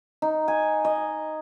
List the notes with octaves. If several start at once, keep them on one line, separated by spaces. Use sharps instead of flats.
D#4
G#5
D#5